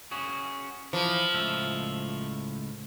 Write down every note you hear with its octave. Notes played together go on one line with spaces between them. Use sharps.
C#4 F#4 G#4
E3 F3
C#2 A2 E5